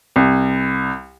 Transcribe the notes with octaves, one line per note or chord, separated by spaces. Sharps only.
C2